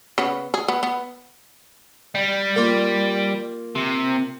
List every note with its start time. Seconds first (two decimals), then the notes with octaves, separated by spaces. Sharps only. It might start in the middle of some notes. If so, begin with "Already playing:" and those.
0.18 C#3 B3
0.54 G#4
0.68 B3
0.83 B3
2.15 G3
2.56 A#3 F4
3.75 C3